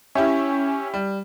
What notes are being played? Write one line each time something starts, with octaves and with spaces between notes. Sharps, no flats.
C#4 E4 G4 E5
G3